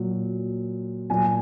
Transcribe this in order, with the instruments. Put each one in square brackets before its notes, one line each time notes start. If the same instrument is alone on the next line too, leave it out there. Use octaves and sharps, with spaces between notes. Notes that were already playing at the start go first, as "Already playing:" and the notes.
Already playing: [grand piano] A#2 F#3
A#2 F#3 G#5